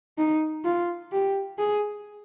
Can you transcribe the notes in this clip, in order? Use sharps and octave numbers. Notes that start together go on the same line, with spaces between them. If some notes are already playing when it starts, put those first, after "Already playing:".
D#4
F4
G4
G#4